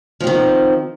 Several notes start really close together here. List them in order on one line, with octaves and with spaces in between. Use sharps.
F3 C4 D#3